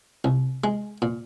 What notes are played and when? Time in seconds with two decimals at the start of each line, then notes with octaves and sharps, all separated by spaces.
0.24 C2
0.64 G#3
1.02 A#2